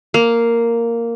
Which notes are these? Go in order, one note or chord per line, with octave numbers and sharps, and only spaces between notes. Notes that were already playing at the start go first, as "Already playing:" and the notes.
A#3